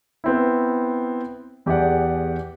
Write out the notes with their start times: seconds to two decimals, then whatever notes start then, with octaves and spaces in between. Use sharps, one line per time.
0.24 B3 C4 E4
1.66 E2 G4 G#4 D5 F#5